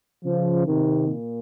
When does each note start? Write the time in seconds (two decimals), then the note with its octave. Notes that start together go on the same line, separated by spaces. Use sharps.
0.25 C#3 F3
0.67 C3 D#3
1.08 A#2